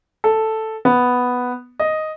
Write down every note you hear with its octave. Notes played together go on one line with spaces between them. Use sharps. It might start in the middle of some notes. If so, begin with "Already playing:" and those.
A4
B3
D#5